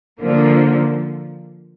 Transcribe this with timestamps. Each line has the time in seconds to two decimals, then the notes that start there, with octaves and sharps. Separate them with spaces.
0.20 D3 F3 A#3